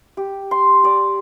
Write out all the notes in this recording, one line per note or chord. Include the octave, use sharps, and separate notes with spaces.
G4
C6
G4 D5